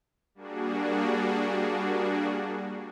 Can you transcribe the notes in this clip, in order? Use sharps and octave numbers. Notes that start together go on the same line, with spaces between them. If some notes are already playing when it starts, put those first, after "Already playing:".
G3 A#3 D4 F#4 G#4